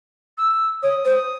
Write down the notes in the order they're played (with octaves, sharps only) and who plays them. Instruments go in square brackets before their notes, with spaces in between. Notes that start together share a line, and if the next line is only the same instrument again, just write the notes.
[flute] E6
[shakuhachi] C#5 [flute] D#6
[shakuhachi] C5